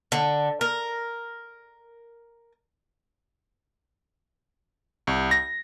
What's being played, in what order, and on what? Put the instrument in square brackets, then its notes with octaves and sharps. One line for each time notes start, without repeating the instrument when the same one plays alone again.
[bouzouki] D3
A#4
[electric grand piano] C2
A#6